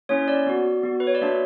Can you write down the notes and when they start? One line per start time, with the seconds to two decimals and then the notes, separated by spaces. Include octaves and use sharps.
0.09 A#3 C#4 E4 C#5
0.28 D5
0.47 B3 F#4
0.83 B3 F#4
1.00 B4
1.07 C#5
1.15 D5
1.21 A#3 D4 F#4 E5